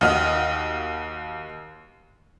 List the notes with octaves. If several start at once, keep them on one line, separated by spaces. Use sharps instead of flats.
D#2 F#4 D#5 F6